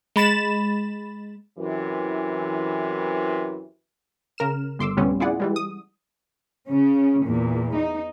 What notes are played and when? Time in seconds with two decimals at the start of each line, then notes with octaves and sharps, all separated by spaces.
0.16 G#3 B5 A6 E7
1.58 F#2 C3 E3
4.38 C#3 A#4 F6 E7
4.79 G1 C6 D6 E6
4.97 D2 A2 C3 G3 B3 C#4
5.20 E4 F4 G#4 D5 F#5
5.40 E3 G3 G#3
5.56 D#6
6.68 C#3 C#4
7.23 E2 A#2
7.76 D#4